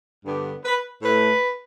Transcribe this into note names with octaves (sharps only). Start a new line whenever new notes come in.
G2 D3 B3 G4
B4
A2 A3 B4